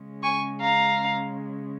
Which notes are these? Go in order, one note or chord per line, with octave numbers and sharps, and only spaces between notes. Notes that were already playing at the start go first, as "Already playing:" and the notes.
Already playing: C#3 G#3 C#4
G#5 C#6
F5 A#5